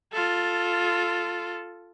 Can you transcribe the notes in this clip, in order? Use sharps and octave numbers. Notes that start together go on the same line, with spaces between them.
F4 A4